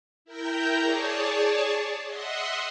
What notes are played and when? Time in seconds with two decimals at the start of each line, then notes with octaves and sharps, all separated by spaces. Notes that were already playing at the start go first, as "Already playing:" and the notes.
0.25 E4 A#4 G5 A#5 G6
0.78 G#4 C#5 D5 A5
2.05 D#5 E5 F#5 C6